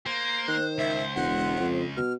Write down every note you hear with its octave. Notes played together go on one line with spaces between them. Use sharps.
A#3 C5
D#3 F#6
C#2 E5
E1 F#5
F2
B2 F6